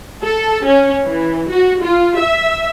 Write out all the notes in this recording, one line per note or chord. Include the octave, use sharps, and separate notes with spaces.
A4
C#4
E3
F#4
F4
E5